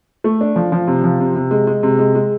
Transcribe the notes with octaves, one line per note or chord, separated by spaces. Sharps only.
A3
D4
F3
F3
C3
F3
C3
C3
G#3
G#3
C3
G#3
G#3